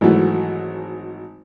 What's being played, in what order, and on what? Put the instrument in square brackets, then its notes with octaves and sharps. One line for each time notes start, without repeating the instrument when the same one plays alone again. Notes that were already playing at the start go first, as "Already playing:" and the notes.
[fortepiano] G#1 E3 F#3 A3